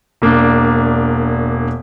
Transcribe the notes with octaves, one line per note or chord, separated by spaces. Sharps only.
E1 A#3 D4